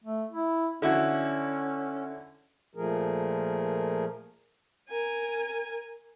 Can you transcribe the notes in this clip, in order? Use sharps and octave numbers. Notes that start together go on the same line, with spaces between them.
A3
E4
D3 C#4 E4 F#4
A#2 F3 A3 G#4 A#4
A#4 G#5